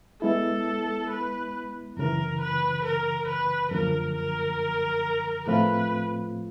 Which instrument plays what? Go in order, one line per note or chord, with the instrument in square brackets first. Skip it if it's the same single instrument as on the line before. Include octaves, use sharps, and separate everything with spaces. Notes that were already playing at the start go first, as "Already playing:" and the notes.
[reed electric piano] G#3 B3 E4 [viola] A4
[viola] B4
[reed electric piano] F#2 C#3 E3 [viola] A#4
[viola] B4
A#4
B4
[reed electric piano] F#2 D3 F3 A#3 [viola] A#4
[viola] A#4
[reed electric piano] A2 F3 A3 C4 F4 [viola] B4